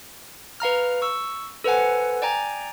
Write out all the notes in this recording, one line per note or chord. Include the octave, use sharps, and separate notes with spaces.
B4 F5 A#5 F6
C#6 E6
A4 B4 C5 F#5 G#5
D5 G5 G#5 A#5